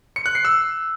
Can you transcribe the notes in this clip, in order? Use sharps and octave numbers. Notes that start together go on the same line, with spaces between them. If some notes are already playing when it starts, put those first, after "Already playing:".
C#7
F#6
C7
E6